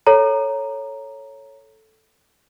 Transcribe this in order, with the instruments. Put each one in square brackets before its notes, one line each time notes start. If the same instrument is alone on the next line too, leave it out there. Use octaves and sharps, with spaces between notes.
[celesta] A4 C#5 A#5